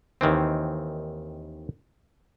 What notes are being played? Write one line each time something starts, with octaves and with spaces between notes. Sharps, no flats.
D#2 D#3 E3 C4